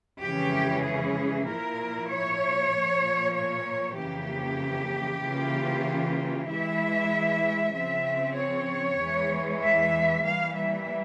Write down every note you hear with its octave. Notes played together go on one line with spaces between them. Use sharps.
F2 C#3 E3 G#3 C#4 G4
G#4
A#2 F3 A#3 E4 A#4
C#5
A#2 F3 A#3
C#5
F2 C#3 E3 A#3 G4
C#3 E3 A#3 F4
E3 G#3 E4 E5
C#3 F3 C4 E5
C#5
E2 E3 G#3
E5
E3 G3 A#3 F5
E5